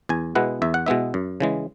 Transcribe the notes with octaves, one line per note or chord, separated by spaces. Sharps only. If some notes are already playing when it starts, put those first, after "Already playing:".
E2 G#5
B2 G#3 B3 E4 F#5
E2 E5
F#5
B2 G#3 B3 E4 E5
F#2
C#3 E3 G#3